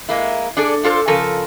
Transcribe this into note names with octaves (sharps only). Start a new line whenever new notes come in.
G#3 A#3 E4
D4 G#4 A4 D5
D4 F4 A4 C5
C#3 F3 A4 A#4